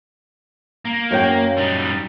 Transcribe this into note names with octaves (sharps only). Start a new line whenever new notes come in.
A#3
F#2 C#5 G5
G3 D#4